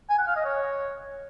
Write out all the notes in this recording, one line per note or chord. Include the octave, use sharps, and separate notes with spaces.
G#5
F#5
F5
D#5
C#5